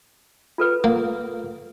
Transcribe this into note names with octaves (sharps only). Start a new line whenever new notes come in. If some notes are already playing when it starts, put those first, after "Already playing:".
F4 A4 B4
A#3